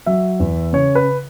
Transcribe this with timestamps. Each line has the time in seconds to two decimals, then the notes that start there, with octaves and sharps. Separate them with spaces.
0.06 F#3 E5
0.40 E2
0.73 C#3 C#5
0.95 B4